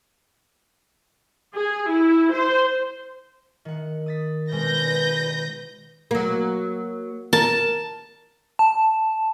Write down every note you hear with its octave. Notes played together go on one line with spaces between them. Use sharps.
G#4
E4
C5
D#3 F#5
D#6 A6 B6
B2 G#3 C4 B4 G6 A#6
F#3 A#3
A#4 A5
A5